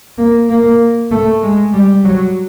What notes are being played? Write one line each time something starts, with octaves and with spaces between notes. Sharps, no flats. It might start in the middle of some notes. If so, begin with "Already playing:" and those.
A#3
A#3
A3
G#3
G3
F#3